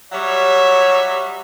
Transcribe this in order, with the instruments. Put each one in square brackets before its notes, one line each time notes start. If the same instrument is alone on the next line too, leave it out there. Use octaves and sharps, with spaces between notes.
[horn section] F#3 G3 E5 [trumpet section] C#5